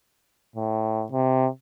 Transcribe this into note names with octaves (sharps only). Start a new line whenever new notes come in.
A2
C3